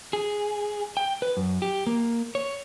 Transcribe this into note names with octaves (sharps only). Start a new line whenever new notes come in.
G#4
G5
B4
F#2
G4
A#3
C#5